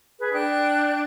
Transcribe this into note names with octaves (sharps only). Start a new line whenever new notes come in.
G#4 B4
D4 G5 F#6